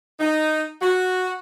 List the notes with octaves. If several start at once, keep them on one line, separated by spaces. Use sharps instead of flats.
D#4
F#4